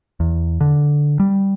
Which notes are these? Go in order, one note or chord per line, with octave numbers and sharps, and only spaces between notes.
E2
D3
G3